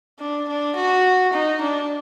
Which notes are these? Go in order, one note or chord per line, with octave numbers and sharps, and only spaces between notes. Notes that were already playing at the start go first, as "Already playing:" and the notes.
D4
D4
F#4
D#4
D4